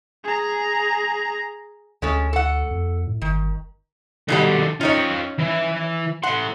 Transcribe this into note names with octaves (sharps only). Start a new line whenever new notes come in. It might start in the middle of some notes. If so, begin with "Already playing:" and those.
G#4 A#5
D2 G#3 C#4 A4
A4 F#5
F2
A2
G1 D#3
G#2 B2 D#3 G3 A4
C#4 D#4 F4 C#5 G5
E3 E4
A2 F#5 C6